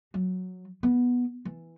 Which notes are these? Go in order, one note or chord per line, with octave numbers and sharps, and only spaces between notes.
F#3
B3
E3